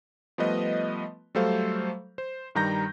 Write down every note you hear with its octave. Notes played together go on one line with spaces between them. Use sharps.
F3 G3 A3 B3 B4 D#5
F#3 G3 A3 A4 C5 F5
C5
G2 D#3 G3 A#5 G6 A#6